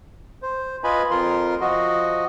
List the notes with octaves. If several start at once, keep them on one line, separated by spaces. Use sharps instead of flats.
C5
F4 B4 D#5 G#5 B5
F2 F3 F4 A#4 C6
F3 F#4 D#5